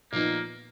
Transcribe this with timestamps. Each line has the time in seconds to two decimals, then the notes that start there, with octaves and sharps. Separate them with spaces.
0.12 A#2 F3 A#3 B3 D#4